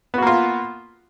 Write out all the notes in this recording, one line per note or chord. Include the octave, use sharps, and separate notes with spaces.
A#3 B3 F4 F#4